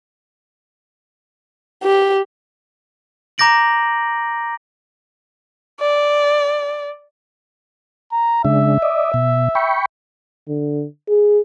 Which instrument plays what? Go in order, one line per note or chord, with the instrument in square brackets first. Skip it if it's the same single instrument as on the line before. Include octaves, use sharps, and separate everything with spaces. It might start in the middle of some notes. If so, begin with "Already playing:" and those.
[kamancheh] G4
[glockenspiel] A#5 D6 G6 A#6 D7 F#7
[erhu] D5
[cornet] A#5
[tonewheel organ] C#3 G#3 D4 [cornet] E5
[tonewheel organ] D5 D#5
B2
G5 B5 C#6
[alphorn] D3
G#4